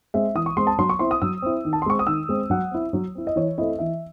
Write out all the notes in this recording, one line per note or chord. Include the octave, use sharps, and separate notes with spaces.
G#3 C4 E5
E3 D#6
C#6
G#3 C4 C6
A5
F#3 C6
C#6
C4 E4 C6
D#6
F#3 E6
C4 E4
D#3
A5
C6
G#3 C4 C#6
D#6
D#3 E6
G#3 C4
F#3 F#5
C4 E4
F#3
C4 E4
D#5
E3 C#5
A3 C4 E4 D#5
E3 E5